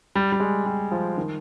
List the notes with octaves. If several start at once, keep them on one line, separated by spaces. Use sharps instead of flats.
G3
G3
G#3
G3
F3
D#3